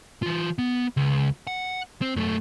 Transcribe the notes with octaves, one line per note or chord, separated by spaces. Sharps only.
E3 F4
B3
C#2
F#5
C4
F#2 A3